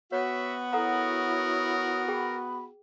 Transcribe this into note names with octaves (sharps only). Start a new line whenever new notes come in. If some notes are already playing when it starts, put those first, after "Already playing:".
B3 F#4 C#5 E5
E4 A4 A#4 C#5 F#5 A#5 D#6
G#4 G5 B5